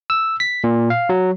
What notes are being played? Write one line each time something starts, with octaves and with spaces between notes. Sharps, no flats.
E6
B6
A#2
F5
F#3